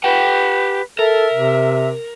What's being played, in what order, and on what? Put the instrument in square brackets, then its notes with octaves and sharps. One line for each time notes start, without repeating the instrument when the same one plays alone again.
[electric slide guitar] G4 F#5 G5 [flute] B4
[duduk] A4 [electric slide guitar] A#4 [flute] E5
[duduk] C3